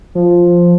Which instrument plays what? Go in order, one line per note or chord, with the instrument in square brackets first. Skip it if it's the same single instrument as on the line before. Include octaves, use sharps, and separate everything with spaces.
[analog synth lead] F3